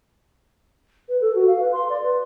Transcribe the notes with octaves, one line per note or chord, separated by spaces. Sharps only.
B4
A4
F#4
F5
B4
C6
D5
B4